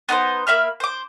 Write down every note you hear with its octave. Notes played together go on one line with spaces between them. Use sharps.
B3 D#4 B4 C5
A#3 E5 B5 F6
C5 D6